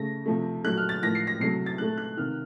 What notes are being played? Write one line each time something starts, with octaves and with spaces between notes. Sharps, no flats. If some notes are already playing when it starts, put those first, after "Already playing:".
Already playing: C#3 A3 A#6
C3 F3 A3
A#2 F#3 A3 F#6
F6
A6
A2 F3 A#3 A#6
C7
A#6
C3 F#3 A3 C7
A6
A#2 A3 F#6
F#6
C3 D#3 A#3 F6